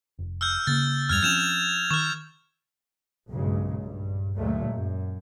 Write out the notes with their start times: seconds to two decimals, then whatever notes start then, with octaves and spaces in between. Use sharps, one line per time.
0.19 F1
0.41 E6 F6 G6
0.67 C#3 A#3 A6
1.09 E2 G2 F6 G#6 F7
1.23 F3 C4 C#4 G6 E7 F7
1.91 D#3 C#6 F6
3.28 B1 G2 A#2 C#3 F#3 G#3
3.81 G2
4.36 D2 A#2 F#3 G#3 A3
4.70 F#2